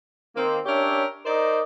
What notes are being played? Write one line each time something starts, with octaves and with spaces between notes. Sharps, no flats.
D#3 A#3 C4
C#4 D4 G4 A#4 C#5 E5
D#4 A#4 C5 D5 D#5